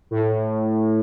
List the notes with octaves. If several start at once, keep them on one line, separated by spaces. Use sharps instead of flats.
A2